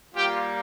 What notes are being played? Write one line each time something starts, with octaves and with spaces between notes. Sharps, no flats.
G3 A#3 F4 G4 G5